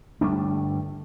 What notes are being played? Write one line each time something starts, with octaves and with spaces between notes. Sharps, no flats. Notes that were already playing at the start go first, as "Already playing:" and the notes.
G1 G3 A3 D4